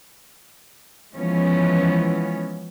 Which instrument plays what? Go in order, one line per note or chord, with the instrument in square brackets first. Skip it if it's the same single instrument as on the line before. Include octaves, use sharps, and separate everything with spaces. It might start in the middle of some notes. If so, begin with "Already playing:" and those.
[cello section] E3 F3 G#3 B3 C#4